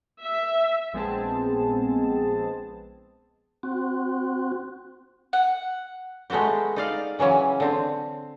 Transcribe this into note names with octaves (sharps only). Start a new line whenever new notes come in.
E5
A#1 G#3 B3 C4 G#4 A5
C4 F#4
F#5
G#3 A3 B3 F#4 G4
D#4 D5 F5
C#3 E3 F#3 C#4
D3 C4